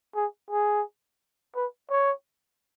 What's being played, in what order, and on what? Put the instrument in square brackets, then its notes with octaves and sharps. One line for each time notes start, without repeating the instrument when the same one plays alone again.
[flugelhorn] G#4
G#4
B4
C#5